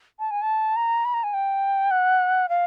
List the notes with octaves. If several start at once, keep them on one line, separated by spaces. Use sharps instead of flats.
A5
G#5
A5
A#5
B5
A#5
G#5
G5
F#5
F5